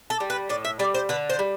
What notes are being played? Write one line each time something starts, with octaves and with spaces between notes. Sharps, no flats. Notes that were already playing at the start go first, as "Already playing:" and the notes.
A4
G3
B4
A2 D5
E5
G3 D5
C5
D3 B4
C5
G3